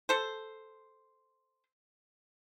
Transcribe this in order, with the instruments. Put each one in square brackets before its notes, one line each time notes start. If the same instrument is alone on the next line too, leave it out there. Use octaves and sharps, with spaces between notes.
[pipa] A4 C5